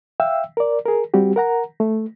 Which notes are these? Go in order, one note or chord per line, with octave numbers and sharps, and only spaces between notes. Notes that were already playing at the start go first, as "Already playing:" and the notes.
E5 F5 G5 E6
A#4 D5
G#4 A#4
G3 C4 F#4 G4
A#4 F#5 A#5
A3